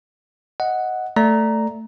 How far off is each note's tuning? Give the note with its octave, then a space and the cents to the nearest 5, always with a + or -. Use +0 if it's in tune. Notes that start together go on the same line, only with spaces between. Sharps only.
D#5 +10 F#5 +0
A3 +10 D5 +0 A#5 +0